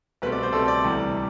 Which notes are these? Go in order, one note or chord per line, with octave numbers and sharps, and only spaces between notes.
C2 B2 A3 C4 B4
D5
C5
C2 B2 A3 C4 A4
D5
D2 C3 E3 G3